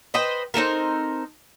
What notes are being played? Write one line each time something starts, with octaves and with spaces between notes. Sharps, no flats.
B4 C5 D#5 G5
C4 D#4 A4 A#4